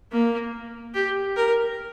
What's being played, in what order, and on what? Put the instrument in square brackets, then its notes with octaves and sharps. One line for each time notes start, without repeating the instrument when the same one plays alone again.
[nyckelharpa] A#3
G4
A#4